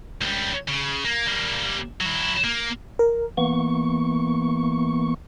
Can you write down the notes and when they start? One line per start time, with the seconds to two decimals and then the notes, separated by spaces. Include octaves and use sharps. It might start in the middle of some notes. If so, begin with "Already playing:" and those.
0.21 C#2 G3
0.68 C#3
1.05 A#3
1.27 G3 A#3
2.01 F#3 E4
2.44 A#3
2.99 A#4
3.37 E3 A#3 B3 C#6